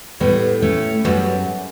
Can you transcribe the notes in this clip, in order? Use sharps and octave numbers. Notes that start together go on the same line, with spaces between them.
A2 G3 B3
A3 C#4
F#2 G3 B3